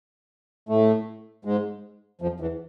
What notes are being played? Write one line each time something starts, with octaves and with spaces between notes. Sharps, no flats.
A2 A3
G#2 G#3
F2 F3
E2 E3